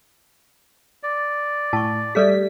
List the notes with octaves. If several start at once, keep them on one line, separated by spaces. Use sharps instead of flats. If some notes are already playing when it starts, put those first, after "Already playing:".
D5
A2 A5 C#6
G3 A3 G#4 A4 D5 B6